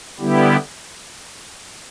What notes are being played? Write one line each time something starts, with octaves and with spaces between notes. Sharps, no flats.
D3 G3 B3 E4 G4